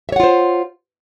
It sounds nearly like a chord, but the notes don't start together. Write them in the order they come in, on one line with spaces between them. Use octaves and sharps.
E5 C#5 F#5 F4 C5